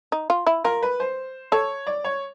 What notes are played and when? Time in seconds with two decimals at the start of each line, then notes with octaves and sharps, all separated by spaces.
0.12 D#4
0.30 F4
0.46 E4
0.64 F4 A#4
0.83 B4
1.00 C5
1.52 A4 C#5
1.87 D5
2.04 C#5